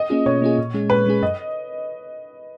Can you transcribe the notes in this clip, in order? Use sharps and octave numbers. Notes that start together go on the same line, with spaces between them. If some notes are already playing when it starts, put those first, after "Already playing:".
Already playing: D#5
A#3 C#4 F4 G#4
B2 C#5
A#3 C#4 F4 G#4
A#2
G#3 C#4 G#4
A#2 B4
G#3 C#4 G#4
F#2 D#5